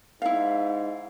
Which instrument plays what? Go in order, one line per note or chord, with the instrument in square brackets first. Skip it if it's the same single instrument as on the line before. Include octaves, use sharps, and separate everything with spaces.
[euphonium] G#2 [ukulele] E4 F5